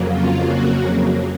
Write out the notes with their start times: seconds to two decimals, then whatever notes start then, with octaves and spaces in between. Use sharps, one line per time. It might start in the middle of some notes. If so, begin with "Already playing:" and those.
Already playing: F2 C#3 F#3 A#3
0.09 F4
0.45 F#4